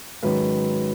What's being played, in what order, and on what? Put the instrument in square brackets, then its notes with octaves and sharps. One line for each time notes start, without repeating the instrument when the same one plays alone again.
[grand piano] G#2 D#3 F#3 C#4 B4